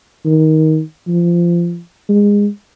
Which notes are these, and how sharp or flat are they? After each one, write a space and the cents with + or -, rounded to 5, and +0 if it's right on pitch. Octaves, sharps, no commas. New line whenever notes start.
D#3 +15
F3 -20
G#3 -25